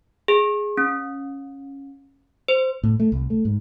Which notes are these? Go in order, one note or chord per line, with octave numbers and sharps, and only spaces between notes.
G#4
C#4
C5
A2
A3
C2
A3
G#2